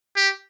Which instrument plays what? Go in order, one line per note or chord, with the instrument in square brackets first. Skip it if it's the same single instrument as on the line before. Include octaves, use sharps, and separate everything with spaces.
[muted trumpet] G4